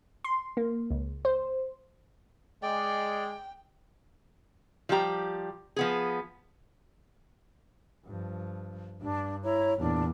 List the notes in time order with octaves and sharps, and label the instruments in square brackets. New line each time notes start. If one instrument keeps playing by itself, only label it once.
[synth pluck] C6
A#3
C#2
C5
[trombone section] G#3 [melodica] D5 [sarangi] G5
[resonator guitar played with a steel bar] F3 G3 D4 G4 A#5
F3 B3 G#4
[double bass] G2 F3
[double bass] G2 [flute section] D4
[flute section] E4 C#5 A#5
[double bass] E2 A#2 [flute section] D4